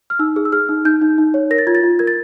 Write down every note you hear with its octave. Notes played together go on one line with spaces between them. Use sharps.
F6
D#4 E6
G#4
E6
G#4 F6
D#4
D#4 G6
D#4
D#4
C#5
A#4 A#6
A6
F4 G#6
A6
F4
A#4 G#6
A6